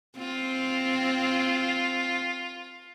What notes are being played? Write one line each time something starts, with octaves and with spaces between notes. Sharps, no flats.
C4 F4